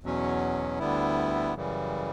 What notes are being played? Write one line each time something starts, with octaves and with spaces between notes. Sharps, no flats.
E2 B2 F#3 C#4
D2 D3 G3 B3 E4
F#2 C#3 E3 G3